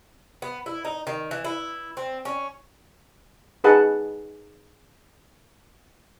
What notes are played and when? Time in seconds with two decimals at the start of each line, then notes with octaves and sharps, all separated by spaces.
0.42 B3
0.66 E4
0.85 D#4
1.07 D#3
1.31 E3
1.44 E4
1.97 C4
2.25 C#4
3.64 D#4 G#4 B4 D#5 F#5 A5